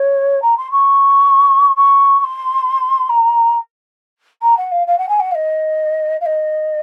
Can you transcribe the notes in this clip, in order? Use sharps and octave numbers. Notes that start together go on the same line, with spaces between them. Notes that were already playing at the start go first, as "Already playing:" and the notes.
Already playing: C#5
A#5
C6
C#6
C#6
C#6
C6
A#5
A#5
F#5
F5
F5
F#5
G#5
F#5
F5
D#5
F5
D#5